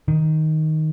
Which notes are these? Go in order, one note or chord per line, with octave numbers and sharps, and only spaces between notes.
D#3